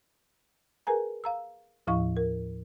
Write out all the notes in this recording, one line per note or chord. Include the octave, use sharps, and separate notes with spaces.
G#4 A#4 B4 G#5 A#5
F5 A#5 E6
D#2 A2 F3 E4 F5 C#6
A#4